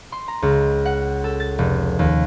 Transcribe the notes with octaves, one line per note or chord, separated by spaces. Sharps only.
C6
A#5
C#2
F#5
A4
A6
F1
D#2